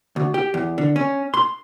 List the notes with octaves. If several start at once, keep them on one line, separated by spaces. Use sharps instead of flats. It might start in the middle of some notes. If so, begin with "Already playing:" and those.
D2
G4
E2
D3
C#4
C6